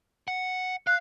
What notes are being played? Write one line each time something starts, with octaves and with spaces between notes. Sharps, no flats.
F#5
F5 F#6